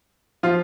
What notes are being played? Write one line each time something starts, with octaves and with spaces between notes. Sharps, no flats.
F3 F4